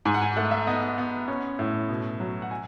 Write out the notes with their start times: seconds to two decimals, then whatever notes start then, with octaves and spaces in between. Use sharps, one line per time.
0.05 G#2 G#5
0.14 F#5
0.21 G#5
0.36 A3 F#5
0.51 E5
0.67 B3 D#5
0.98 B3
1.28 C#4
1.59 A2
1.89 B2
2.20 F#3
2.42 F#5
2.51 G#5